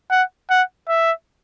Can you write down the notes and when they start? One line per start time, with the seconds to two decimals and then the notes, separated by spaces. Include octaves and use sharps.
0.11 F#5
0.50 F#5
0.89 E5